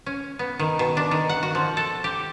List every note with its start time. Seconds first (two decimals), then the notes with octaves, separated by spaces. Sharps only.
0.06 C#4
0.39 B3
0.59 D#3
0.79 B2
0.97 D4
1.11 D#3
1.29 F#5
1.43 F#4
1.55 F3
1.77 A4
2.04 G4